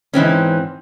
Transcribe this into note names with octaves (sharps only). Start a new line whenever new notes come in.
G#2 E3 C4 C#4